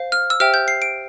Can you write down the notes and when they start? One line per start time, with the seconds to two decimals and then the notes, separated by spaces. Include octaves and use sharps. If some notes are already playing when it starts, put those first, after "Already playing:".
Already playing: C5 F5
0.12 F6
0.30 E6
0.40 G4 C5 E5 G5 F6
0.54 G6
0.68 C7
0.82 D7